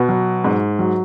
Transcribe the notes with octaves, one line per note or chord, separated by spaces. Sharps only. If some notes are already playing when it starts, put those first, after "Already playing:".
Already playing: B2 B3
F#3
G#2
F#3